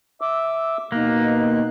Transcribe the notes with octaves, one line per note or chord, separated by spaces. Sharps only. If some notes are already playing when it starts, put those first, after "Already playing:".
E5 D6 E6
B2 A#3 D#4 F#6